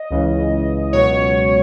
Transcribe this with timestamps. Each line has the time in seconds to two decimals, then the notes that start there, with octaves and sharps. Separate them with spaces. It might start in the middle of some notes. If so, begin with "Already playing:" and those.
Already playing: D#5
0.10 C#2 C#3 E3
0.93 C#2 B2 F#3 C#5